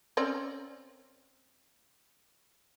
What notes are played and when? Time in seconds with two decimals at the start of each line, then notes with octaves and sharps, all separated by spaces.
0.17 C4 C#4 D5